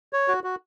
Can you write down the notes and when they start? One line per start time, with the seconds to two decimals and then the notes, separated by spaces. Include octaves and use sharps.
0.13 C#5
0.28 F#4
0.44 F#4